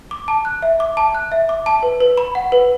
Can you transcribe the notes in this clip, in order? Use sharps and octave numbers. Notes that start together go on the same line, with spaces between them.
D6
A5
F#6
E5
D6
A5
F#6
E5
D6
A5
B4
B4
B5
F#5
B4